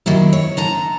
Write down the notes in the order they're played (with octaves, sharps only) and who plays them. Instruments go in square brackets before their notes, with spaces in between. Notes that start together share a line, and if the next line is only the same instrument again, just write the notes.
[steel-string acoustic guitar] D#3 F#3 A#3 E4
C#5
D3 A5 A#5